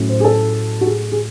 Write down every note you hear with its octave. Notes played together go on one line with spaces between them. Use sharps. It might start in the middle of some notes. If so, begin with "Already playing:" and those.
Already playing: A2 F#3 C#4 E4
C5
G#4
A4
F#4
G#4
G#4